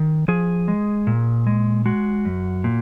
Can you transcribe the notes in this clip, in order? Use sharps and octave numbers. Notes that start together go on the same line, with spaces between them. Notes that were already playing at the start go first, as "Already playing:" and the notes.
Already playing: D#3
F3 G#4
G#3
A#2
G#3
G#3 F#4
F#2
A#2